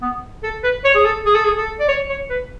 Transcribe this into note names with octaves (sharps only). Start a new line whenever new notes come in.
B3
A4
B4
C#5
G#4
A4
G#4
A4
G#4
A4
D5
C#5
C#5
B4